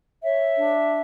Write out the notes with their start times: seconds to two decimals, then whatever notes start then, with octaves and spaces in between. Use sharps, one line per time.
0.24 C#5 E5
0.58 D4